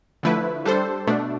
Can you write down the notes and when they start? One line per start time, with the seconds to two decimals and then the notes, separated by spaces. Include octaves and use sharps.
0.23 D3 F3 A3 E4 B4
0.65 G3 D4 A4 C5
1.07 B2 A3 D4